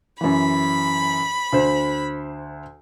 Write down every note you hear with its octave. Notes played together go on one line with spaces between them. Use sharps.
F#2 E3 B5
D2 C5